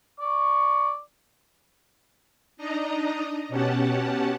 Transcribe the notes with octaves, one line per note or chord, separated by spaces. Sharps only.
D5 C#6
D4 D#4 D#5 A#5
B2 C#4 G4 F#5 A5